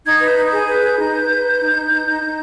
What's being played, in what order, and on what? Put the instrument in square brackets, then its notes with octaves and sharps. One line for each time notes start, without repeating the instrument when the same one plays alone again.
[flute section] D#4 G#6
B4
G6
D#4
G6
G#4
B4 G6
G#4
D#4
B4
B4
B4
D#4
D#4
D#4
D#4
D#4